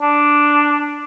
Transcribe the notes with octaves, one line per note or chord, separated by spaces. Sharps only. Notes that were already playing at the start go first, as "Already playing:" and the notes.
D4